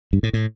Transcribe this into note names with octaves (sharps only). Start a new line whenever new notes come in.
G2
A2
A2